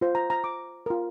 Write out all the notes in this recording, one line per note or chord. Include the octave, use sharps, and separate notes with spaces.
F4 C5
A#5
A#5
D6
F4 A#4